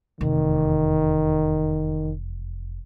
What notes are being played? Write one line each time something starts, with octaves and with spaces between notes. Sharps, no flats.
F1 E2 D#3